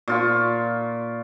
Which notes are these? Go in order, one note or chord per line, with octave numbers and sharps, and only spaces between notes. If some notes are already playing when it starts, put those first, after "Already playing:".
A#2 F4 C#6